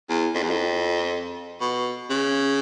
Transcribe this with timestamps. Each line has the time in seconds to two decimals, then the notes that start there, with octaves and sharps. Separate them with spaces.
0.09 E2
0.34 F2
0.43 E2
0.50 F2
1.61 B2
2.10 C#3